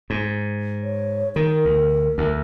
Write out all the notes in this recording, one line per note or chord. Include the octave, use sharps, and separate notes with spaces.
G#2
C#5
D#3 A#4
D2
D2